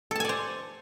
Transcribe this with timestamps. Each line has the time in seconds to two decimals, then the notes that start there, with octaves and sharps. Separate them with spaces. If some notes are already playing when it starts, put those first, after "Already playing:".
0.11 A4
0.16 A5
0.20 G#5
0.25 D5
0.29 C5